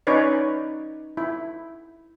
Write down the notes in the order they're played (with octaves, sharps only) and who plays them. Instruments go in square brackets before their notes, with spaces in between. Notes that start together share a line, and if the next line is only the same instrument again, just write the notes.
[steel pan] C#4 D#4 B4 C#5 D5
E4 B5